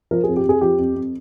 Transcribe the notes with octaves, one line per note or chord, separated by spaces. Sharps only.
F3 A#4
G#4
F2
G4
F2 G#4
F3 G4
F2
F2